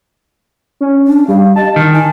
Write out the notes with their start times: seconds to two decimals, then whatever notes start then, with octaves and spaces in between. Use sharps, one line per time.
0.81 C#4
1.07 D4
1.28 G3 F5
1.56 D#5 A5
1.76 D#3 D#4
1.93 G#5